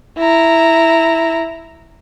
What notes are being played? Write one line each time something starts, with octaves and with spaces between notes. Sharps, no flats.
E4 A#5